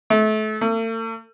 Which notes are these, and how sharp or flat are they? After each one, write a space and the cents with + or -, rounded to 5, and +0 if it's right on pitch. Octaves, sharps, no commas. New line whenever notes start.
A3 -30
A3 +45